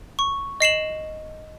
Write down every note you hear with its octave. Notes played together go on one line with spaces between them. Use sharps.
C#6
D#5 C7 E7 F#7